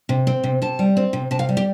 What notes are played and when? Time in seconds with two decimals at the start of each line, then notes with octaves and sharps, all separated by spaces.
0.09 C3
0.27 C4
0.44 C3
0.62 C3 A5
0.79 G3
0.97 C4
1.13 C3
1.31 C3 A5
1.39 F5
1.49 G3
1.57 G4